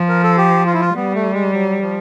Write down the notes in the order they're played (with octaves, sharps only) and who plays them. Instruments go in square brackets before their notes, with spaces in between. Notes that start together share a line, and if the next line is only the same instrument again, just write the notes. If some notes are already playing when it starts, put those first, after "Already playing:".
Already playing: [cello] F3
[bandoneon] A#4
A4
G4
F4
E4
F4
[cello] G3 [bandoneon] B3
[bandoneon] A3
G#3
F#3
F3